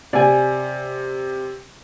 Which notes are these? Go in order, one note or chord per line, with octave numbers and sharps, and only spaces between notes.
C3 D5 G#5